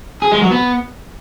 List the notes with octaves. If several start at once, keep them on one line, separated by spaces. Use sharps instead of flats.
G#4
G#3
F#3
B3